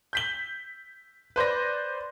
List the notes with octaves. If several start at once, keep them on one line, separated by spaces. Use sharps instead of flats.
G6 B6 G7
B4 C5 D5 A#6